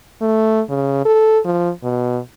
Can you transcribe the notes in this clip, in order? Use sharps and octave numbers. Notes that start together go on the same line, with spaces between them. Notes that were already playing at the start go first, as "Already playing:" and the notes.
A3
C#3
A4
F3
B2